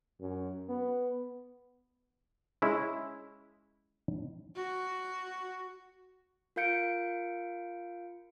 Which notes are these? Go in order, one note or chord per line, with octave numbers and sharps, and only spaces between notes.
F#2
B3
G#3 C#4 E4
F#4
F4 A#4 F5 G6 C#7 D7